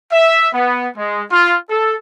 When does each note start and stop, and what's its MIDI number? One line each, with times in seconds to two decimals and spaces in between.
0.12 0.48 76
0.54 0.88 59
0.97 1.22 56
1.31 1.57 65
1.70 1.96 69